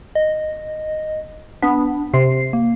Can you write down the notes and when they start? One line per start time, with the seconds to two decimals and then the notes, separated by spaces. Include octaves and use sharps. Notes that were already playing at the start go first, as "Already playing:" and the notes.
0.15 D#5
1.62 B3 D4
2.14 C3 C7
2.53 A#3